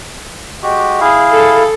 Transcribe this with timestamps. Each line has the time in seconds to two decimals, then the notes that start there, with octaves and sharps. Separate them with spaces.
0.63 G#3 F#4 G4
1.01 E4 G#4 F5
1.31 A4